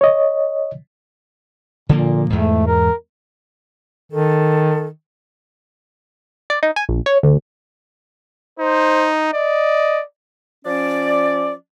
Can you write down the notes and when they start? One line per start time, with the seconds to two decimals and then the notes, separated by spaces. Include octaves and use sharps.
0.01 C#5 D#5
1.89 A#2 D3 F3 A#3
2.30 E2 G#2 A3
2.67 A#4
4.12 D#3 A4
6.50 D5
6.63 D#4
6.76 G#5
6.89 A#1
7.06 C#5
7.23 D2
8.59 D#4 C5
9.33 D5 D#5
10.65 F3 C#4 D5